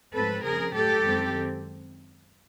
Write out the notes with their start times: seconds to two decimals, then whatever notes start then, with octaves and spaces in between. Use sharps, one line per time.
0.14 G#2 F3 A3 C4 A4 B4
0.44 C#3 F3 A3 G#4 A#4
0.75 A2 F#3 A3 G4 A4
1.05 F#2 D#3 G#3 C4